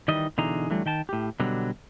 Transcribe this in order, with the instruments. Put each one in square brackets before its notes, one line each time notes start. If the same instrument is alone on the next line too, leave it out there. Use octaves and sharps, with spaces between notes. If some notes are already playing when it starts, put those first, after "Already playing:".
[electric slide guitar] D#3 E3 G3 D#5
B2 D3 E3 D#4 G#4 A#5
D3 E3 F#3 G3 A3
D#3 G5 A5
A2 G4
B2 D3 F#3 G3